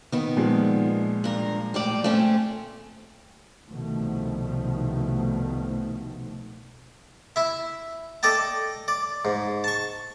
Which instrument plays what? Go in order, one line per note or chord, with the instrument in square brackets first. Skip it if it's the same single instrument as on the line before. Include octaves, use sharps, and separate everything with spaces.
[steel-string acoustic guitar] D#3 B3
[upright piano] A#2 F3 G#3
[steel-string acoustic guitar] G2 A#4
A2 G3 D5
A3 C4 C#4
[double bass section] C2 B2 D#3 F3 A3
[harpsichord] E4 E5
A4 D5 D#5 G5 A5
D5
G#2
A5 C#6